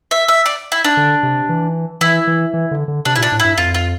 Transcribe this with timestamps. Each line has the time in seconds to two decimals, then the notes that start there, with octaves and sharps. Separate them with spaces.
0.11 E5
0.28 E5
0.46 D5
0.72 E4
0.84 D4
0.97 D3
1.23 C3
1.49 E3
2.01 E3 E4
2.27 E3
2.54 E3
2.71 D3
2.88 D3
3.05 C3 D4
3.16 A#2 E4
3.23 D4
3.32 A2
3.40 G2 E4
3.58 F2 F4
3.74 F4